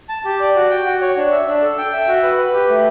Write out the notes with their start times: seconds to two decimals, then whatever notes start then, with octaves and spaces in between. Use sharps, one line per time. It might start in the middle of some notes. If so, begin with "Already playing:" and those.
0.09 A5
0.25 G4
0.40 D5
0.55 F#4
0.71 G5
0.86 F#4
1.01 C#5
1.17 D4
1.31 E5
1.47 D4
1.62 A4
1.78 G5
1.93 E5
2.07 F#4
2.23 B4
2.38 B4
2.53 G4
2.69 A3